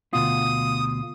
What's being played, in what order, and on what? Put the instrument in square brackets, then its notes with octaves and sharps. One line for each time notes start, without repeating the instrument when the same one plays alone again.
[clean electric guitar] D2 B2 F4 [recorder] D#6